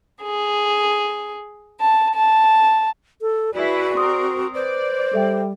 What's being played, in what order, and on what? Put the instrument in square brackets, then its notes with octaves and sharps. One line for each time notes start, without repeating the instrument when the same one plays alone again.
[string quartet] G#4
A5
A5
[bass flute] A4
[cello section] E4 G#4 B4 [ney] F#4 [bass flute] D5
[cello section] C4 A#4 [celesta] C6 D#6
[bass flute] B4 [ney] C5 [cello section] D5
[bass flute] G3 [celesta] A4 E5 G5